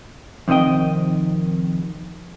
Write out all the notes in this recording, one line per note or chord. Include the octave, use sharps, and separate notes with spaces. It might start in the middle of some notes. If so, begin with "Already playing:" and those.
F2 C3 D#3 D#5 G5